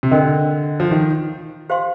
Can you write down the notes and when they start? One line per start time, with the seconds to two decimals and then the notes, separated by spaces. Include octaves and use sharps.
0.03 C3
0.11 D3 A#4 D#5 G5
0.80 F3
0.91 D#3
1.69 G4 C5 F5 C6